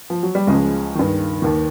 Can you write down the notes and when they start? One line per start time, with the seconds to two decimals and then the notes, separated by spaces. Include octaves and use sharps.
0.10 F3
0.23 F#3
0.35 G3
0.47 C#2 C#3 F3 G#3
0.95 G2 D#3
1.42 D#2 D#3